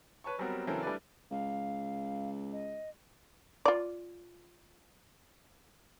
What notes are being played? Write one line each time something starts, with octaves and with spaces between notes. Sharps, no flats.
B4 C#5 A5 C#6
F#3 G3 B3 C4 F#4 A#4
C#3 E3 F#3 C4 A4 A#4
G3 A3 D4 E4 B4 D5
C#2 F5
D#5
F4 D5